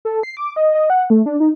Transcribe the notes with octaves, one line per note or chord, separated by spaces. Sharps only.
A4
C7
D6
D#5
D#5
F#5
A3
D4
D#4